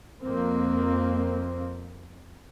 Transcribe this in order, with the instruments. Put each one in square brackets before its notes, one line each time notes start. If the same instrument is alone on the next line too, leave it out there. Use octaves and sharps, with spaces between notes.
[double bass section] F2 A#3 C4